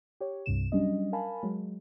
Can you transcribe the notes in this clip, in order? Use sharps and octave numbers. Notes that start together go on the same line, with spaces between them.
G4 C#5
C2 G2 C3 E7
F#3 G3 C#4 D4 D#5
A#4 F5 G#5 A5 B5
F#3 G#3